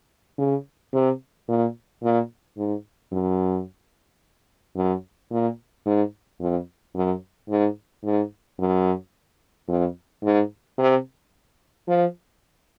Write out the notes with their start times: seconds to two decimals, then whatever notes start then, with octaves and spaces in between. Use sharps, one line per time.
0.38 C#3
0.93 C3
1.48 A#2
2.03 A#2
2.57 G#2
3.12 F#2
4.76 F#2
5.31 A#2
5.86 G#2
6.40 F2
6.95 F#2
7.49 G#2
8.04 G#2
8.59 F#2
9.68 F2
10.24 G#2
10.78 C3
11.88 F3